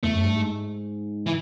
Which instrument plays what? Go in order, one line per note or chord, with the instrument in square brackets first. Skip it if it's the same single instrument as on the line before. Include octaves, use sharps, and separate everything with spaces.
[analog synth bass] E2 [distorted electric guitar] A3
[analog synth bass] F#2
G2
G#2
[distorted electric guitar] E3